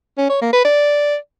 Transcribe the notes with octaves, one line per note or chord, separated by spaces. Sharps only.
C#4
C#5
A#3
B4
D5